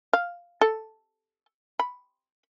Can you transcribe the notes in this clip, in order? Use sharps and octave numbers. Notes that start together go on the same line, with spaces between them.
F5
A4
B5